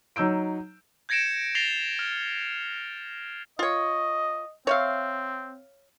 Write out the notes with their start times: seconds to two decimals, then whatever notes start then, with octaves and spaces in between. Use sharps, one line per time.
0.16 F#3 D#4 E6 G6 D7
1.09 G6 G#6 A#6 C#7 D7 E7
1.55 A6 A#6 C7 F7 G7
1.99 F6
3.59 F4 C#5 D#5
4.67 C4 C#5 E5 F5